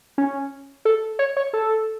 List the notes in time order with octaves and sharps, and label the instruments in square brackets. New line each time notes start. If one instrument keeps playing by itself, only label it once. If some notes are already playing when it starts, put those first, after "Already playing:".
[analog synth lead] C#4
A4
C#5
C#5
A4